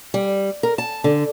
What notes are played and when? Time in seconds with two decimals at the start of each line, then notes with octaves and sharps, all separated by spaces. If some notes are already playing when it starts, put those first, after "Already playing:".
0.14 G3
0.63 A#4
0.78 A5
1.04 D3